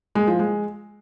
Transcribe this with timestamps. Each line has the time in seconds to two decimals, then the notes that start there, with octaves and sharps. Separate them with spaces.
0.15 G#3
0.27 F3
0.39 G#3